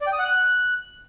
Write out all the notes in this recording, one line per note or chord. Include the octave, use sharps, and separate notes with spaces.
D5
G5
D#6
F#5
F#6